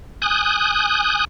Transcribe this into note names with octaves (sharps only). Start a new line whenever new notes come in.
G#5 D#6 F#6 G6